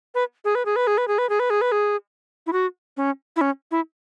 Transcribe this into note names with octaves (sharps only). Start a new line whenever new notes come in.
B4
G#4
B4
G#4
B4
G#4
B4
G#4
B4
G#4
B4
G#4
B4
G#4
E4
F#4
C#4
E4
C#4
E4